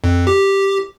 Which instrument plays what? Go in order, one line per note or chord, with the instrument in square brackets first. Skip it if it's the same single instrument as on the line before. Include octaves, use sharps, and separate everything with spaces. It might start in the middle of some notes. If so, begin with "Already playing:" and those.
[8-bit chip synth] F2
G4